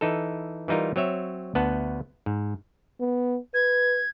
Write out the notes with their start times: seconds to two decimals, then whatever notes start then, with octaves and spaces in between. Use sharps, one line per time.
0.01 E3 D#4 A4
0.68 E3 G3 D#4 F4 A#4
0.96 F#3 C4 C#5 E5
1.55 D2 B3 F#5 A5
2.26 G#2
3.00 B3
3.54 B4 G#6